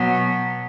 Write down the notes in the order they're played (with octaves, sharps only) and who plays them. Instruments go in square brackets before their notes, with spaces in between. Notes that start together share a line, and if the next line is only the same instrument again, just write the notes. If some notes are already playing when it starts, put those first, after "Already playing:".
Already playing: [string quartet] B2 F#3 B3